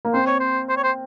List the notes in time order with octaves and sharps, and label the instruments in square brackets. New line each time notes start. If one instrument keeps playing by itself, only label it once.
[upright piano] A#3
[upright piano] C4 [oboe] C5
[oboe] C#5
C5
C5
C#5
C5